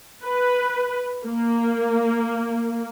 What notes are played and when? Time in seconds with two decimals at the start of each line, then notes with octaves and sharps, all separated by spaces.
0.24 B4
1.25 A#3